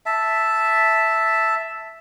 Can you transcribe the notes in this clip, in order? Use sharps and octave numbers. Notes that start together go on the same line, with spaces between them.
E5 A5